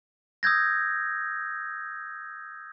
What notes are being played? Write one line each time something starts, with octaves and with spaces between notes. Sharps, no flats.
D#6 E6 G6 G#6 A#6